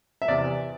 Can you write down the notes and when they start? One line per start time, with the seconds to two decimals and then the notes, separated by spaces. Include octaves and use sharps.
0.22 E5
0.28 E2 C3 E3 D5